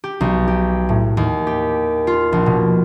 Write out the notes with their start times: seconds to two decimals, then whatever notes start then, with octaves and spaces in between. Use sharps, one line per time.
0.04 G4
0.21 B1
0.48 G4
0.89 A2
1.17 D#2
1.47 G4
2.07 F4
2.32 A#1
2.46 B2